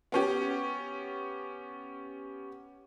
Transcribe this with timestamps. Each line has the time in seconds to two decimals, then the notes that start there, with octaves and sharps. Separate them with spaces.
0.12 B3 C#4 G4